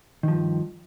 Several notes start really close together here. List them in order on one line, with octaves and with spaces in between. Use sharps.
D#3 F3 G2